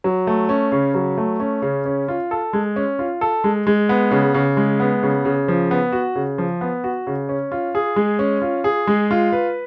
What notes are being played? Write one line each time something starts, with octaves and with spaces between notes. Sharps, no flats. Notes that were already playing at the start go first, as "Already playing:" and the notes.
F#3
A3
C#4
C#3
F#3
A3
C#4
C#3
C#4
F4
A4
G#3
C#4
F4
A4
G#3
G#3
B3
C#3
C#3
G#3
B3
C#3
C#3
F3
B3
F#4
C#3
F3
B3
F#4
C#3
C#4
F4
G#4
G#3
C#4
F4
G#4
G#3
F4
B4